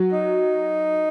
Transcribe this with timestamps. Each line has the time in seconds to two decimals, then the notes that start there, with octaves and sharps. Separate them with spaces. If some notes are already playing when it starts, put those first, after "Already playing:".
Already playing: F#3 F#4
0.12 D#4